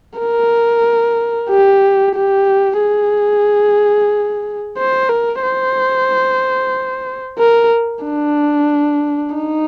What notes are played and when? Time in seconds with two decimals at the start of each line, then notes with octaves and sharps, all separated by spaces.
0.19 A#4
1.50 G4
2.16 G4
2.81 G#4
4.77 C5
5.09 A#4
5.43 C5
7.38 A#4
8.05 D4
9.35 D#4